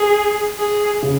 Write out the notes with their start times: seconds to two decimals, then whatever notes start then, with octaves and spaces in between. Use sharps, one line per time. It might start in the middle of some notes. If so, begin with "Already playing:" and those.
Already playing: G#4
0.59 G#4
1.03 C#3